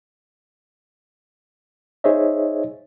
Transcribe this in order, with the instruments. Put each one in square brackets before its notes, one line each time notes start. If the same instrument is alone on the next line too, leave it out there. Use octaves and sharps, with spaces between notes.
[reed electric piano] D#4 G#4 C5 C#5 D#5 E5